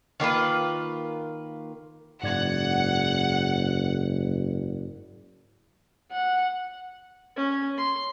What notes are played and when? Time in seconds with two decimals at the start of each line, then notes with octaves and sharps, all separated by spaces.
0.20 D#3 A#3 F4 B4
2.23 F#1 G#2 D5 F#5 G#6
6.11 F#5
7.37 C#4
7.77 C6